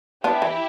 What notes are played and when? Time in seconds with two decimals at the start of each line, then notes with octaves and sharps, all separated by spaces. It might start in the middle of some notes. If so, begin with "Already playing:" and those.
0.24 B3 D4 E4 G4
0.42 E3